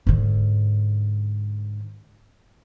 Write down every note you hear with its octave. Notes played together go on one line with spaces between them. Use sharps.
G#2 D3